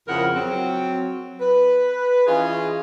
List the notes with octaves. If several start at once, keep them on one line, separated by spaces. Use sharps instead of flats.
F2 C#3 E4 A#4 F#5
F#3 C4
B4
E3 C#4 F4 G#4 D#5